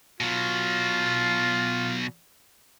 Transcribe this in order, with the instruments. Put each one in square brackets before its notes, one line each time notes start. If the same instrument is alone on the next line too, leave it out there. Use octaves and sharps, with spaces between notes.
[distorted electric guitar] B2 F#3 [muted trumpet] F4